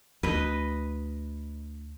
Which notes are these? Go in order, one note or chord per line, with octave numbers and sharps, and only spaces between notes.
D2 B4 D#5